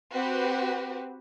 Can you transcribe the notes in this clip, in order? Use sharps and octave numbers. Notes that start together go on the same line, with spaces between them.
C4 F#4 G4 B4